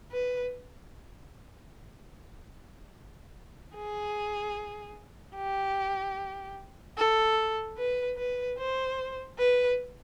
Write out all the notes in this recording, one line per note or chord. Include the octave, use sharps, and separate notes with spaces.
B4
G#4
G4
A4
B4
B4
C5
B4